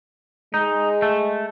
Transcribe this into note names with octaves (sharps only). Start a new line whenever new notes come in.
G#3 D#4
A3